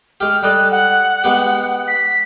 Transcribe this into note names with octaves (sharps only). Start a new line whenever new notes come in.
G#3 G4 F6
G3 A4 D#5 F#6
F#5
G#3 B3 G4
B6